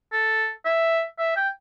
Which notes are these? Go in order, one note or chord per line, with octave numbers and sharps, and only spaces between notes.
A4
E5
E5
G5